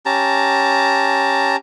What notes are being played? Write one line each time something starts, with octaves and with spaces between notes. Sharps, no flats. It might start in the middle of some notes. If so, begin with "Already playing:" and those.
C#4 G4 A5 A#5